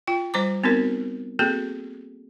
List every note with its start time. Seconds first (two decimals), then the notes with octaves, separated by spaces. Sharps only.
0.07 F4 G5
0.34 G3 C5 A#5 D6
0.64 B3 C4 D#4 F#4 A#4
1.39 A#3 C4 F#4 G#4 A4